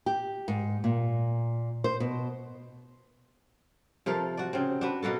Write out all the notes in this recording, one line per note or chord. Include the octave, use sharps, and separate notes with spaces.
G4
G#2
A#2
C5
B2
C3 F3 A4 A#4
F#4 D5
C#3 C4
D4 F#4 B4
B2 A#3 F#4 A4